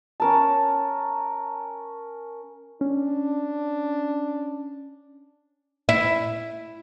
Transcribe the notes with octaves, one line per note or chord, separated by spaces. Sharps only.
C#4 A#4 A5
C#4 D4
E4